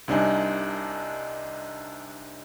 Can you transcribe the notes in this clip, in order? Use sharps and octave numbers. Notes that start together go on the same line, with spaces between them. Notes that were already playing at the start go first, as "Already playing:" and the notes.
C2 C3 D4 D#4 G#5